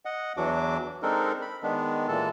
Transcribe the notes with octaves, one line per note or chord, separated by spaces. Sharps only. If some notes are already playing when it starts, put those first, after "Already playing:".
D#5 F#5
E2 E3 F#3 D4 F#4 D6
G#3 C4 D4 D#4 A4 A#4
B5
D#3 G#3 B3 D4
A#2 E3 G#3 A4 A5